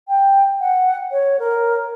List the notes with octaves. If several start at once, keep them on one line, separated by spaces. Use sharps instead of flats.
G5
F#5
C#5
A#4